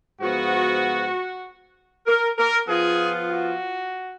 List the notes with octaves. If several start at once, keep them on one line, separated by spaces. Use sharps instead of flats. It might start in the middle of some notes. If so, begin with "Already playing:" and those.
G#2 F3 B3 F#4
A#4
A#4
F3 B3 F4 G#4
F#4